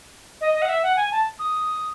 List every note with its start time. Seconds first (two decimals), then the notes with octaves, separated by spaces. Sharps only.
0.41 D#5
0.54 D#5
0.62 F#5
0.69 E5
0.83 F#5
0.96 G#5
1.11 A5
1.39 D#6